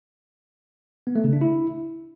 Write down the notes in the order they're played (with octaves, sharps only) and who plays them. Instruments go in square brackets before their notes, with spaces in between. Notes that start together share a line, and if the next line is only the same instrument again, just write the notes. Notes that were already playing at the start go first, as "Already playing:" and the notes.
[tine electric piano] B3
A3
C#3
D4
E4